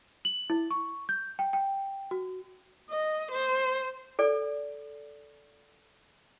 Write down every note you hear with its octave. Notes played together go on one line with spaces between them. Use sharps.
F#7
E4
C#6
G6
G5
G5
F#4
D#5
C5
A4 D5